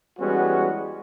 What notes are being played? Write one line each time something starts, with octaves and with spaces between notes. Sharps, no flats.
E3 G3 G#3 B3 C#4 F#4